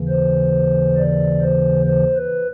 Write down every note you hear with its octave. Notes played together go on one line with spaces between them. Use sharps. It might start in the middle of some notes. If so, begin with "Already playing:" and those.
Already playing: D#2 C#3 E3
C5
D5
C5
C5
B4